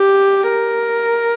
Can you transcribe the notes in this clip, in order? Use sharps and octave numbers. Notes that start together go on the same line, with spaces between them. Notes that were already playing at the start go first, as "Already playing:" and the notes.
Already playing: G4
A#4